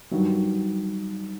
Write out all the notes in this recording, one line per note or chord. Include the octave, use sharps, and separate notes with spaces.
G2 D#3 F#3